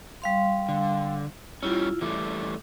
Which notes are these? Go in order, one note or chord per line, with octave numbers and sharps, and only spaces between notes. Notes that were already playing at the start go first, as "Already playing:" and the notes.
G3 F5 C6
D3
G3 C#4 E4 F4
E3 G3 A3 D6